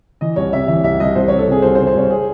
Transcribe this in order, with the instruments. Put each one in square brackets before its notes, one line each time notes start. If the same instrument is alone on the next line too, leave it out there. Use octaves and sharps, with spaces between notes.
[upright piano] E3 D#5
C2 C#5
C3 E5
E3 E5
C2 E5
C2 D#5
C2 C5
C3 C#5
A4
C3 G#4
C2 C5
C5
C3
C5
C2 C#5
G#4